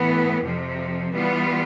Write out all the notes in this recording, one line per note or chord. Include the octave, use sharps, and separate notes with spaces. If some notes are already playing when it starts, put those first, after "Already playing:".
Already playing: A2 E3 B3
F2 C3 F3
E3 G3 B3 F4